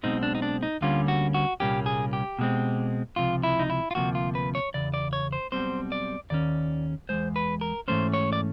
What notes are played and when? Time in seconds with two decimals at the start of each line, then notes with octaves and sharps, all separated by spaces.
0.03 B1 B2 G#3 C4 D#4
0.23 D4
0.35 D#4
0.42 D4
0.63 D#4
0.81 D2 D3 G3 A#3 C#4 F4
1.08 F#4
1.34 F#4
1.60 C2 A#2 G3 A#3 C#4 G4
1.86 G#4
2.13 G4
2.39 B2 G#3 C4
3.16 C#2 C3 F3 F4
3.43 E4
3.59 D#4
3.70 E4
3.91 F4
3.95 D2 C3 F3 A#3 F#4
4.15 F4
4.35 B4
4.55 C#5
4.74 E2 C#3 D5
4.94 D5
5.13 C#5
5.33 C5
5.52 B1 B2 G3 C4 C5
5.92 D5
6.30 D#2 D#3 C#4 D5
7.09 E2 B2 G#3 C5
7.36 B4
7.61 A#4
7.88 G#2 E3 A3 C#4 C5
8.13 C#5
8.33 D5